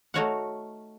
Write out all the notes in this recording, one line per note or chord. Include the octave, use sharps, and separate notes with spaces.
A3 D#4 F#4 C#5 F5 F#5